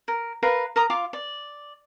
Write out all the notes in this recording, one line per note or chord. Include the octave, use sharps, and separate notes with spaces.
A#4
A#4 B4 F5 B5
A#4 A#5 D#6
F4 F5 D6
D5